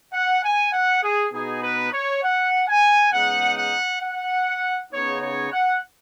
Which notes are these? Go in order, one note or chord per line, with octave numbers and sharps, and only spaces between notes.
F#5
G#5
F#5
G#4
B2 B3 D#4 G#4
B4
C#5
F#5
G#5
C#3 G#3 B3 D#4 F#5
F#5
F#5
C#3 B3 D#4 C#5
C#5
F#5